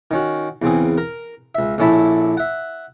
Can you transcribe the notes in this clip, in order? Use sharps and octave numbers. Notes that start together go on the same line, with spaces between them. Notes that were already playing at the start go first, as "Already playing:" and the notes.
D#3 C#4 F#4
E2 C#3 C4 G#4
A#4
C#2 E5
A#1 D3 C#4 E4 A5 B5
E5 F#5